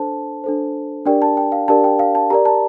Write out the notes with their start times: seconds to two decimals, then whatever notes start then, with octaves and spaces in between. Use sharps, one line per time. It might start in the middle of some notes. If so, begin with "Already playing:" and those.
Already playing: D4 A4 C5 A5
0.44 D4 A4 C5
1.06 D4 G4 A#4 D5 G5
1.22 A5
1.37 G5
1.52 F5
1.68 D4 G4 A#4 D5 A5
1.84 G5
1.99 F5
2.15 A5
2.30 G4 A#4 D5 A#5
2.45 A5